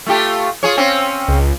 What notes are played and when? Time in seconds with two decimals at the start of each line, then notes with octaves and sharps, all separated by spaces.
0.06 A3 F4 G4
0.63 F4 G#4 C#5
0.77 C4 C#4
1.28 C#2